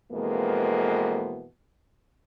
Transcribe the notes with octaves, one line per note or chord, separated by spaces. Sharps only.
F2 B2 E3 G#3 A#3 C4